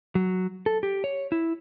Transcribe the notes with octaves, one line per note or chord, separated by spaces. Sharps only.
F#3
A4
G4
C#5
E4